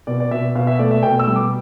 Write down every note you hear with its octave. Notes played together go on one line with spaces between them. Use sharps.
B2 D5
D5
B2 E5
B2 F5
E5
A3 D5
E5
B2 G5
E6
G3
D6